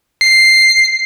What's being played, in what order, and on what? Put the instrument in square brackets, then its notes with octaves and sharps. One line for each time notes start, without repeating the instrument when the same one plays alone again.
[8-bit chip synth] C7